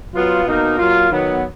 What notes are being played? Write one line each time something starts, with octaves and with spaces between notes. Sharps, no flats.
F#3 B3 F4
B2 A#3 D#4
F#3 A#3 F4
D#3 F#3 B3